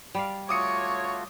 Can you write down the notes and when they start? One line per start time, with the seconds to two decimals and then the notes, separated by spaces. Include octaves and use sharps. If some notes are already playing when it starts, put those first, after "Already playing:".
0.15 G3 D5 F5
0.49 A3 F4 F#4 C#5 D6 D#6 C#7